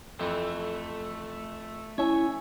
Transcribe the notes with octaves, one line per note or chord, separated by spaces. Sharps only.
F2 E3 A3
C#4 E4 C#5 E5